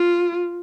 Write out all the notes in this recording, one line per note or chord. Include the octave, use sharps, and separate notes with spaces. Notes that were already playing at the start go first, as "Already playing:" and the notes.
Already playing: F4